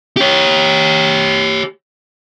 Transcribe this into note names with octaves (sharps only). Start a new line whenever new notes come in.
G4 C#5